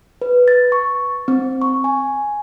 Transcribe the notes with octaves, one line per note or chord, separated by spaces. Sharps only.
B4
A6
C#6
C4
C#6
G#5